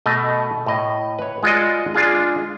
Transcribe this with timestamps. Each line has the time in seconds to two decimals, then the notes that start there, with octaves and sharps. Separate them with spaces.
0.06 B2 A3 D#5
0.66 A2 D#5
1.19 B4 C#5
1.43 G#3 F4 F#4 D5 D#5
1.94 G#3 D4 F4 G#4